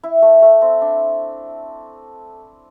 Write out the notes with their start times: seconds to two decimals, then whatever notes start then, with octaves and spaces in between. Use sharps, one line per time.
0.03 E4
0.22 A3
0.42 A3
0.62 C4
0.82 D4